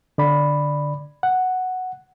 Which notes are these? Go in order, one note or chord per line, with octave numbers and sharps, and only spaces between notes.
D3 D5 B5
F#5